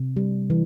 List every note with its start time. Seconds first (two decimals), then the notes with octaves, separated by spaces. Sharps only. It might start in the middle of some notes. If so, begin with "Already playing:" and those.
Already playing: C3
0.16 G3
0.50 E3